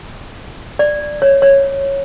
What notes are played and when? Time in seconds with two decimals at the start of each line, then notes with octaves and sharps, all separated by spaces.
0.79 D5
1.22 C#5
1.42 C#5